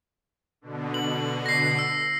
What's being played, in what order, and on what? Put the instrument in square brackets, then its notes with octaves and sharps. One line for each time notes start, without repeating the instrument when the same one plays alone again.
[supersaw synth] B2 D3
[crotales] F#7
A#6 C7
E6